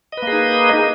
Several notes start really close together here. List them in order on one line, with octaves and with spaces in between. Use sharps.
D#5 B4 A#3 G#4 D#4